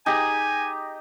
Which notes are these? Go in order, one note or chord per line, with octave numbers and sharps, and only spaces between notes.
D#4 G4 G#4 G#5